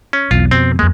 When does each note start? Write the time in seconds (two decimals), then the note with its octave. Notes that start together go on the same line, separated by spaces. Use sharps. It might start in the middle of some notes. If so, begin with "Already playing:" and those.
0.13 C#4
0.31 B1 E2 F4
0.51 F2 B2 C4
0.79 F2 G#3 A#3